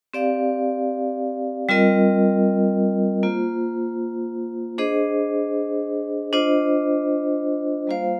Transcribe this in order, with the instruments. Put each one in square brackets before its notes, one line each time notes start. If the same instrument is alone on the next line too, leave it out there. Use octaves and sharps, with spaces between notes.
[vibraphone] C4 G4 D5 F5
G3 C4 F4 A#4 D#5
A#3 F4 C5
D4 G#4 C5 D#5
D4 F4 C5 D#5
G3 A#3 F4 C5 F5